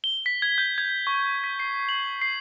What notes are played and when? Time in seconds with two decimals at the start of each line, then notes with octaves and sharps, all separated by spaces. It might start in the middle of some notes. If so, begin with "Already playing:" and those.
0.04 G7
0.26 B6
0.42 G#6
0.58 G6
0.78 G#6
1.07 C#6
1.44 B6
1.60 C7
1.89 F#7
2.22 C7